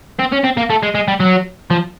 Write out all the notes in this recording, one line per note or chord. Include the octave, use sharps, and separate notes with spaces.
C4
C#4
C4
A#3
A3
G#3
G#3
G3
F#3
F3